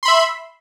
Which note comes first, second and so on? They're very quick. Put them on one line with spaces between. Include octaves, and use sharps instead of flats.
C6 B5 E5